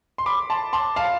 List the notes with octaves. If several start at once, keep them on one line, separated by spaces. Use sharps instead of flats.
C6
B5 D6
A5 C6
A5 C6
F5 A5